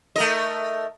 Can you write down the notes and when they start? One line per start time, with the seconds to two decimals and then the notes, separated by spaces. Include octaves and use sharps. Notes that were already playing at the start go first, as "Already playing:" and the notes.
0.16 A3 A#4 D#5